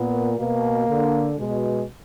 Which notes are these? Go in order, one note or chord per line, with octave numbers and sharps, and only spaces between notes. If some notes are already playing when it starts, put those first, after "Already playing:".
Already playing: A#2 B3
B2 A#3
D3
B2 G#3